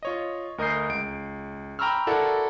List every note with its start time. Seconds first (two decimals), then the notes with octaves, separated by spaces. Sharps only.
0.03 F4 C#5 D#5
0.58 D2 A#4 D#5 D#6 G6 C7
0.89 C#2 D7
1.79 G5 A#5 B5 C#6 E6 F6
2.07 E4 F#4 A4 A#4 D5 F#5